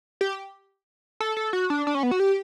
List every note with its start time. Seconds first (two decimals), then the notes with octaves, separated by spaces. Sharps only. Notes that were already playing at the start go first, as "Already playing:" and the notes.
0.21 G4
1.20 A4
1.37 A4
1.53 F#4
1.70 D4
1.87 D4
1.95 C#4
2.03 B3
2.11 F#4
2.20 G4